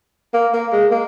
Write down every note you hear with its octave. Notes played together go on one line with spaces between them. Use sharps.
A#3
A#3
G#3
A#3